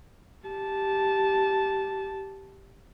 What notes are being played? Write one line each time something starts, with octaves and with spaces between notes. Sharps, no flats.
G4 A5